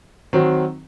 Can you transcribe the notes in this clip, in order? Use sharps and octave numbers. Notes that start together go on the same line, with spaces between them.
D#3 F#3 C4 F#4